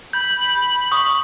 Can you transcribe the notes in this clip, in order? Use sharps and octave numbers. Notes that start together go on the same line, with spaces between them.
B5 G6
C#6 D#6